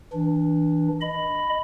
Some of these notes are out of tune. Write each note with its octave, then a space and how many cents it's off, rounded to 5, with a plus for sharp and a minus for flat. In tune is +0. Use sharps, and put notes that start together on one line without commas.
E3 -20 D4 +0
D#5 +0 B5 +10